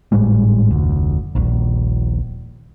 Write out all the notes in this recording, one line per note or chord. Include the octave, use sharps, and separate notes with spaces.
G#1 A2 G3 G#3
F1 D2
D#1 A#1